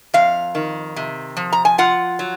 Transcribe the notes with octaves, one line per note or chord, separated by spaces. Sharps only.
F2 F5
D#3
C3
F3
A#5
G#5
F4 F#5
F#3